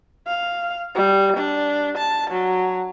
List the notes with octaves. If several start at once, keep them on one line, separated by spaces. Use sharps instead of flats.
F5
G3
D4
A5
F#3